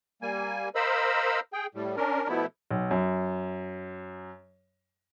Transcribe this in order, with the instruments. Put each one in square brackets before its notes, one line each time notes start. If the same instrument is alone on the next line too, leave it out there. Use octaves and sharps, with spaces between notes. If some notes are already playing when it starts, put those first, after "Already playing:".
[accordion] G3 A#3 G#5
A#4 C5 D#5 F5 B5 E6
G#4 G5
A2 G3
C#4 D4 A#4
B2 F3 A3 B3 E4
[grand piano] B1
F#2